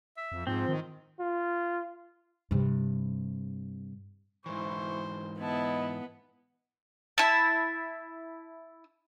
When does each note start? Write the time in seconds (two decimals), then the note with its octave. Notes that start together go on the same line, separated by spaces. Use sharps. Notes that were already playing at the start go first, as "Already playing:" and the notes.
0.17 E5
0.32 F2
0.47 G#2 F3 C4
0.69 D#3
1.20 F4
2.51 G2 C3
4.46 G#2 E3 E4 C5 C#6
5.40 B3 E4 D#5 A5
7.18 E4 A5